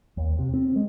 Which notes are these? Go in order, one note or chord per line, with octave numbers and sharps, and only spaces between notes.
D#2
C3
C4
G#3